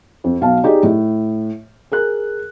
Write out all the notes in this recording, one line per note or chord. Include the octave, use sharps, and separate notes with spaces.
F2
B1 F5 A5
D#4 G4 G#4 D5 D#5
A2
G#4 A#4 F#6